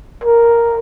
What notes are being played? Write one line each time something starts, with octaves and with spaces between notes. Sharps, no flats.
A#4